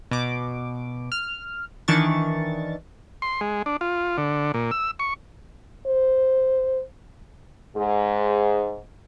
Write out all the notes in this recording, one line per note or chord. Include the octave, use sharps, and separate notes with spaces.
B2 D6
F6
D#3 E3 D4 C#6 A6
C6
G#3
D4
F4
D3
A#2
E6
C#6
C5
G#2 G#4